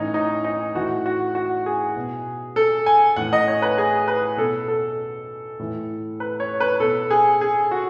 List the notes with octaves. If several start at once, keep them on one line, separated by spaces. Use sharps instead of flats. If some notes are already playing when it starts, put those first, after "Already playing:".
Already playing: A2 E3 C#4 D#4
D#4
D#4
A2 E3 F#4
F#4
F#4
G#4
B2
A4
G#5
A2 E3 F#5
D#5
C#5
B4
G#4
B4
B2 A4
A4
A2 E3
B4
C#5
B4
B2 A4
G#4
G#4
F#4